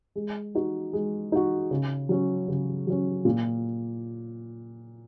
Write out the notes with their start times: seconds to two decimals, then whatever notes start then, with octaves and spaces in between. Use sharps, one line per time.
0.16 G#3
0.55 D#4 F#4
0.93 G#3
1.32 D#4 F#4
1.71 C#3
2.09 F#3 C#4
2.48 C#3
2.87 F#3 C#4
3.25 A#2